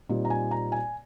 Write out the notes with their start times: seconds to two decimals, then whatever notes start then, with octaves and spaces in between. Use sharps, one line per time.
0.09 A#2 G3 C4 D#4
0.25 A#5
0.30 G#5
0.51 A#5
0.72 G#5